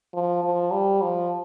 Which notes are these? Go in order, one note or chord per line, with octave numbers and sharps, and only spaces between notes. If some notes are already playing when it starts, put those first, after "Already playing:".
F3
F3
G3
F3